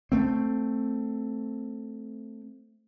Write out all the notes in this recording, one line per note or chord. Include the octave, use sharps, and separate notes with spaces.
A3 C4